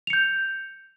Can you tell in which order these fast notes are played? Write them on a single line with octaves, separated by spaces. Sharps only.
F7 C#7 G6